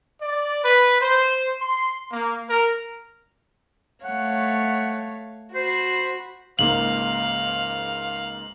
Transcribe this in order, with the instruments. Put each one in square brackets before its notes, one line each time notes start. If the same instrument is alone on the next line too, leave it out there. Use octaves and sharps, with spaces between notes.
[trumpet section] D5
B4
C5
C6
A#3
A#4
[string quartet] A3 C#5 F5 [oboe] F#5
[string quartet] F#4 B5 [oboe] C5
[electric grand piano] C#2 G#2 A#3 [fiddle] F5 [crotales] F#7